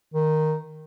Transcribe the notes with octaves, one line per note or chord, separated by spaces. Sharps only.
D#3